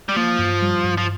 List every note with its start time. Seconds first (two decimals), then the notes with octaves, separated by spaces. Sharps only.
0.09 G3
0.16 F3 A#3
0.39 G2
0.62 G3
0.84 G2
0.97 F3